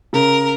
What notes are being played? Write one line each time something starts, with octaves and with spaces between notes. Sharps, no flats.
C#3 A#4